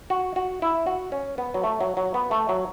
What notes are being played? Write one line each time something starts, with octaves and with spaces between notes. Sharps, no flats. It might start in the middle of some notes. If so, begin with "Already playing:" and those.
F#4
F#4
E4
F#4
C#4
B3
F#3
A3
F#3
F#3
B3
A3
F#3